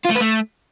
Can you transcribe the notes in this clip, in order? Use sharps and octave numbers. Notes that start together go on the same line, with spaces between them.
F4
A3
B4
A3